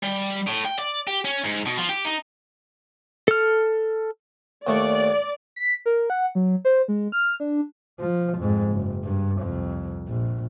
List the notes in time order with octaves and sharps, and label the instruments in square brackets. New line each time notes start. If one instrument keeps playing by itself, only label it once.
[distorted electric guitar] G3
A2
G5
D5
G4
C#4
G#2
B2
F3
G4
D#4
[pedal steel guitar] A4 F6
[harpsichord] D#2 A3 C#6 [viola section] D5
[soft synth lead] B6
A#4
F#5
F#3
C5
G#3
F6
D4
[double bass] F3
F2 G#2
F#1
G2
C2 F2
A#1